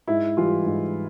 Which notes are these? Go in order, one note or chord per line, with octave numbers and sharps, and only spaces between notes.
G#2 E4
E3 G3 F4
G#2